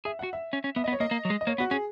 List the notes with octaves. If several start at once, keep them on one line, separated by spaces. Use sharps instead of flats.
G#4 E5
F#4 F#5
E5
C#4
C#4
B3 E5
D#5
B3
C#5
A#3 D#5
A#3
F#3
G#3
D#5
A#3 C#5
B3 F#4
C#4 G#4